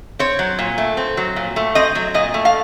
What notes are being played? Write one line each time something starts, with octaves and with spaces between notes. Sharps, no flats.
C4 C#5
F#3
A#2
A3
C4
F#3
A#2
A3
C4 D#5
F#3
A#2 D#5
A3
F5